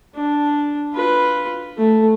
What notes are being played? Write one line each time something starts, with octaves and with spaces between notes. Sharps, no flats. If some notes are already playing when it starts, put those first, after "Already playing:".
D4
F4 B4
A3